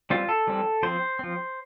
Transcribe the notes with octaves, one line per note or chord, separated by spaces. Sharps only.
E3 G3 C4 F4
A4
E3 G3 C4
F3 C4 C5
F3 C4